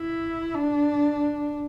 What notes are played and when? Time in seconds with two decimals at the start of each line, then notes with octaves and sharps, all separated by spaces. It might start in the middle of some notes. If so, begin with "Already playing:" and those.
Already playing: E4
0.55 D4